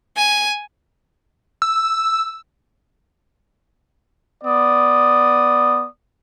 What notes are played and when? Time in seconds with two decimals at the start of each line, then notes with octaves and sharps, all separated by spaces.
0.17 G#5
1.62 E6
4.44 B3 D5 D#6